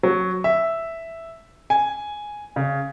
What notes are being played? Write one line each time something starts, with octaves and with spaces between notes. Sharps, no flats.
F#3
E5
G#5
C#3